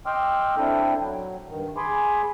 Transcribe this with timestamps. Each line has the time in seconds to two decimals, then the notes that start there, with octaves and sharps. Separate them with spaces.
0.06 D#5 G5 C6 D6 E6 F6
0.57 C4 D4 E4 A4 G5
1.00 F#3
1.49 G2 D#3
1.77 G#4 G#5 B5 C6 D6